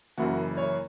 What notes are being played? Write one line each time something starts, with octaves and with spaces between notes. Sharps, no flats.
F#1 F#2 E3 F#4
C#5